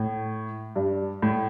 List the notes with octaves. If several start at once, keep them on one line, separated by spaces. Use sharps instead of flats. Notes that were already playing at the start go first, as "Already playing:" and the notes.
Already playing: A2
G2
A2